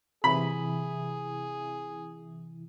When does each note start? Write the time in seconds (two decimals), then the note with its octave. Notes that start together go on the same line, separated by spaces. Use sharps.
0.24 C3 E3 E4 G#4 B5